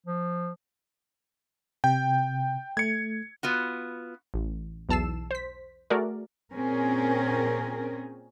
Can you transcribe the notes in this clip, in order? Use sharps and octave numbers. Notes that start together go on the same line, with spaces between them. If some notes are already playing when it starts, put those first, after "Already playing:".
F3
C3 G5
A3 G#6 C#7
B3 F4 F#4
A1
B1 E2 A5 E6 C7 E7
C5 B6
A3 F#4 G#4 A#4 D5
A#2 C4 C#4 G#4 A#4